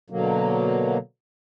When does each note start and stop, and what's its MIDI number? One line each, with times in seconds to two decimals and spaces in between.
0.10 0.98 47
0.10 0.98 50
0.10 0.98 54
0.10 0.98 58